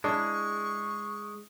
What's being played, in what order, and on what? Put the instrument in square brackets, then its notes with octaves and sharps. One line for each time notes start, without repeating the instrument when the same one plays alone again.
[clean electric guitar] G#3 [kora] D4 E4 [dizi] C#6